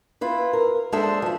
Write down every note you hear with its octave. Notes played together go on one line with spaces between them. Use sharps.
E4 F4 B4
A#4
G#3 D4 A4 C5 D#5 E5
E3 F3